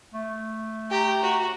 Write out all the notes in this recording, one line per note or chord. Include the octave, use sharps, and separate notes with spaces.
A3
G4 A#5
F#4